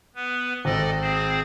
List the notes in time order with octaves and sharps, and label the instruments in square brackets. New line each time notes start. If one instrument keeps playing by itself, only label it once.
[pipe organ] B3 B4
[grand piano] G#1 [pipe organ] A4 D5 D#5
[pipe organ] C4 G#4 C5